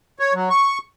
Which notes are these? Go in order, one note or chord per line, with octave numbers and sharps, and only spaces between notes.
C#5
F#3
C#6